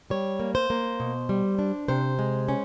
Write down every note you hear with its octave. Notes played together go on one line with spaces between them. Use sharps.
G3 C#5
A#3
C5
A#3
B2
G3
D4
C3 C5
G#3
C#4